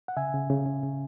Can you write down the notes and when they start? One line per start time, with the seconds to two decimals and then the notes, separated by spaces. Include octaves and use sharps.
0.08 F#5
0.17 C#3 E5 G#5
0.34 C#3
0.50 C#3
0.66 C#3
0.83 C#3